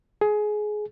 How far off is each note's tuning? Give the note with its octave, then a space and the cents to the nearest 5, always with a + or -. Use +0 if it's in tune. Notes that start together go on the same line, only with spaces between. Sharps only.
G#4 +20